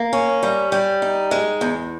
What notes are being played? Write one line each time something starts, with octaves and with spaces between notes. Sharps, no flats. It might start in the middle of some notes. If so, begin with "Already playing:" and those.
Already playing: A#3
C#4
G3
G3
D#4
G#3
E2